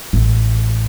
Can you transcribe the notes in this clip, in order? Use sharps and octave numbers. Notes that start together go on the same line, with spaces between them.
A1